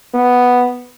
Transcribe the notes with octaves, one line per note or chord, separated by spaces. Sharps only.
B3